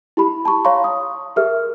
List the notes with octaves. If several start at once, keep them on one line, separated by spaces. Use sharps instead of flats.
E4 G4 B5
A5 B5 C#6
C#5 F5 A#5 C6 C#6
D#6
G4 G#4 A#4 E5 F6